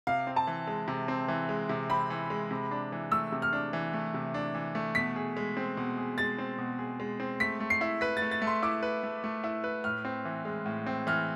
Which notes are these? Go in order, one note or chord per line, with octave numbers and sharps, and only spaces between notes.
C3 F5
C4
A5
E3
G#3
C3
C4
E3
G#3
C3
C4 B5
E3
G#3
C3
D4
E3
A3 E6
C3
F6
D4
E3
A3
C3
D4
E3
A3
B2 B6
G#4
G#3
C4
B2
G#4
G#3 A6
C4
B2
G#4
G#3
C4
A3 B6
A3
C7
E4
B4 B6
A6
A3
A6
A3
C6
E4 D6
B4
A3
A3
E4
B4
A2 F6
C4
E3
G#3
A2
C4
E3 F6